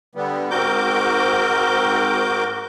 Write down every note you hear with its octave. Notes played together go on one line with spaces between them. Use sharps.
D3 G3 B3
G#2 C4 F#4 A#4 D6 G6